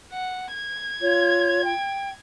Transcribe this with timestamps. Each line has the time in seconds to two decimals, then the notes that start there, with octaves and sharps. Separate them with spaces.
0.12 F#5
0.54 G#6
1.01 F4 C#5
1.64 G5